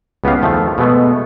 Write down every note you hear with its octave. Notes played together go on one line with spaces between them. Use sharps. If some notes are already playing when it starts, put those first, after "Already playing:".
C#2 B3 F#4 G4 F5
E2 D#3 F3 A3
B2 G#3 A3 B3